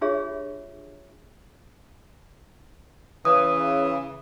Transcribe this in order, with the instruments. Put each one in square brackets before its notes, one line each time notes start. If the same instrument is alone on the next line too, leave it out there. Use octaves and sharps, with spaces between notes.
[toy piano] D4 F4 G4 G#4 C#5 E5
[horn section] C#3 E3 [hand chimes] D#6